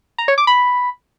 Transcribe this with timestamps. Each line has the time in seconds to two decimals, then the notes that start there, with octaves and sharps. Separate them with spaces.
0.18 A#5
0.28 C#5
0.38 D6
0.47 B5